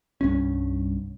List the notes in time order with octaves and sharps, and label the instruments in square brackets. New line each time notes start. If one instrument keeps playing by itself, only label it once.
[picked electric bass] C2 G2 C#4